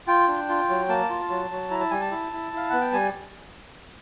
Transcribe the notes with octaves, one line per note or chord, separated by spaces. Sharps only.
F4 G5
D4
F4
F#3
A#3 A5
F4
F#3
F#3
E4 A#5
A5
G3 G#5
A5
E4
E4
E4 F5
B3 F#5
G5
G3 G#5